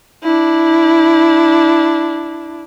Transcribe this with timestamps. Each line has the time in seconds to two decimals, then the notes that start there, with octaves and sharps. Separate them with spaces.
0.23 D4 E4